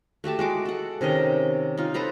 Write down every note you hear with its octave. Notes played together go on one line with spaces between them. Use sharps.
A3 F#4 G4 A5
G#3 F#4 D6
A4 F#5
C3 D#3 C#4 D#5
D#4 F4
A4 B4 C5 A#5